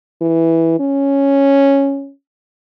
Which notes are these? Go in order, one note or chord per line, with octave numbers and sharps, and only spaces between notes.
E3
C#4